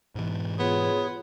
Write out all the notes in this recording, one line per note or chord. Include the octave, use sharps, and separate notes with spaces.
G#2 B2 E3
B3 F4 G#4 C#5